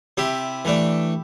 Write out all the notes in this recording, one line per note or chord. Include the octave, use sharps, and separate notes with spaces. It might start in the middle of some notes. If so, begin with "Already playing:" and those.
C3 E4 G4
E3 A3 D4